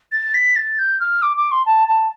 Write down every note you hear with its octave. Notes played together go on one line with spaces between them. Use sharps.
A6
B6
A6
G6
F6
D6
D6
C6
A5
A5